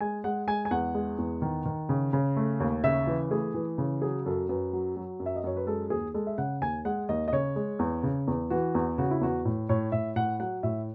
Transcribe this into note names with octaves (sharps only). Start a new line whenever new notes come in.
G#3 G#5
G#3 F#5
G#3 G#5
G#5
E2 F#5
G#3
E2
D#3
D#3
C#3
C#3
A3
D#2
C#3 E5
E3
A3 G#4
E3
C#3
F#3 G#4
F#2 A4
F#2 B4
F#3
F#3
F#2
E5
D#5
F#2 C#5
B4
G#3 A4
D#2 G#4
G#3 A4
E5
C#3 F#5
D#2 G#5
G#3 F#5
D#2 D#5
D#5
C#3 C#5
G#3
E2
C#3
E2
E3 F#4
E2
C#3 F#4
E4
E2 F#4
A2
A2 C#5
A2 E5
A2 F#5
F#3 F#5
A2 E5